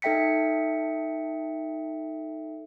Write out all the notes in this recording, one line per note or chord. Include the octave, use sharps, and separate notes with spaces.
D#4 A4 E5 G5 B6 C#7